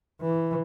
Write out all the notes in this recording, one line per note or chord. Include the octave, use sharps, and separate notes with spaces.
E3